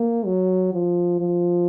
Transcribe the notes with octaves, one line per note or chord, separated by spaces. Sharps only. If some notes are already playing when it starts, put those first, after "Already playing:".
Already playing: A#3
F#3
F3
F3